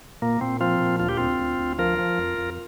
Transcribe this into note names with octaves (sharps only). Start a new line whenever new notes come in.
A#2 A#3
A#2 C4
F3 C4 F4
A#2
D2 F4
G4
D2 C4 F4
D2
D2
F3 F4 A#4
F3
F2
F2